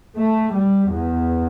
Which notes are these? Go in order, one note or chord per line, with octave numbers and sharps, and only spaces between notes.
A3
G3
E2